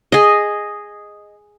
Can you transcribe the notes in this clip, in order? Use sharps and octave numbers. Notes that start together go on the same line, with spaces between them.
G#4 D#5